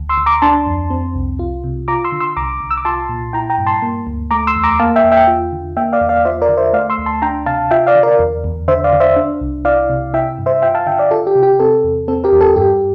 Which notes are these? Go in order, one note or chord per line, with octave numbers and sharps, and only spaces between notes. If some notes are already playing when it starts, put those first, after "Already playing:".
Already playing: D2
C6 E6
D2
A#5 D6
D4 A5 C6
F2
C4
C2
F4
C3
F4 A#5 D6
C6 E6
D3
C6 E6
C2 A#5 D6
C2
E6
D6
F4 A5 C6
A#2
E4 G5 A#5
G5 A#5
G2
A5 C6
A#3
D2
A3 A#5 D6
C6 E6
E2
A#5 D6
A#3 F5 A5
E5 G5
E2
E5 G5
F4
D3
A#3 E5 G5
D5 F5
E2
D5 F5
F4 C5 E5
A#4 D5
D3
C5 E5
A3 D5 F5
C6 E6
D2
A5 C6
D4 G5 A#5
C3 F5 A5
F4 E5 G5
D5 F5
D3
A#4 D5
E2
E2
D3 C5 E5
D5 F5
D3
C5 E5
D4
C2
E4 D5 F5
C3
E4 E5 G5
G2
C5 E5
F4 E5 G5
F5 A5
D3 E5 G5
D5 F5
F4 A4
G4
C3
G4
C4 A4
E2
C4 A4
G4 A#4
E2
A4
G2 G4